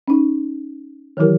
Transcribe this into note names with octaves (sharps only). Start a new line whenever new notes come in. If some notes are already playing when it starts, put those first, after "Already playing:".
C#4 D#4
D#3 E3 F#3 E4 G4 A#4